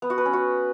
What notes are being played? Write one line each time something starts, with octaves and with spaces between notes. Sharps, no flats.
B3
F#4
B4
C#4
F#4